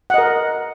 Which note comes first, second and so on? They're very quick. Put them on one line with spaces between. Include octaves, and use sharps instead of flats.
F#5 D#5 A#4